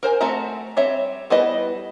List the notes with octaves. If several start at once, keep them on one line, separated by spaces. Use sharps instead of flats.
A#4 C5 G#5
A3 C4 F#4 E5 A#5
G3 C4 C#5 E5
G3 B3 E4 B4 D#5